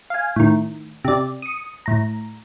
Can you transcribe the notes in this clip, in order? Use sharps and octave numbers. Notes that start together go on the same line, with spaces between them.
F5 G#5
A2 D#3
C3 D5
D#6 C#7
A2 A#5